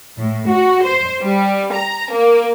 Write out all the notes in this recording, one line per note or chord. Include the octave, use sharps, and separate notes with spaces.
A2
F#4
C5
G3
A#5
A#3